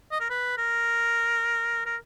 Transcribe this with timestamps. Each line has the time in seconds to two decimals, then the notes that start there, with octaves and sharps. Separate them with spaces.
0.11 D#5
0.20 A#4
0.30 B4
0.58 A#4
1.86 A#4